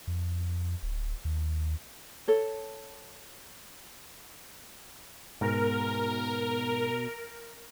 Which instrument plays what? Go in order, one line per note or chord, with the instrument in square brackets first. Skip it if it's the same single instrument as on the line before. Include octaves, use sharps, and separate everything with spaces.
[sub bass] F2
D1
D#2
[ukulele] A4 C#5
[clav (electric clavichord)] G#2 [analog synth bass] B2 [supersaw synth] A#4